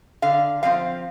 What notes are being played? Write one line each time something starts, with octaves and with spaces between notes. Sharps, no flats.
D3 F5
F3 C4 F5